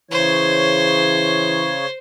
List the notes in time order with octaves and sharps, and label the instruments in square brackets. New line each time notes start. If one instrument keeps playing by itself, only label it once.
[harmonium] C#3 C#5 [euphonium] E3 [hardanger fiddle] C5